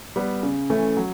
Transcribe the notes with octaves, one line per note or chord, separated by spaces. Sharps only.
G3 B3
C#3
E3 A3 C#4
F#3